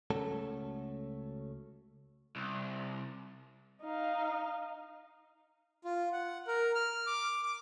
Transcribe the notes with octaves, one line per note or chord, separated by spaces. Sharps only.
C#2 A3 C#4 F#4 A4
C2
D#4 F5
F4
F#5
A#4
F6
D6
D6